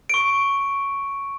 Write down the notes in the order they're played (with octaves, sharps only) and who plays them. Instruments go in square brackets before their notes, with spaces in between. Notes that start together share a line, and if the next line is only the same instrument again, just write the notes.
[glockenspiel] C#6 D7